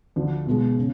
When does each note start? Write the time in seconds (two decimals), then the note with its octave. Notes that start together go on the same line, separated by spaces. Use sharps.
0.16 D2 D3 F3
0.46 B1 B2 G#3
0.78 C#3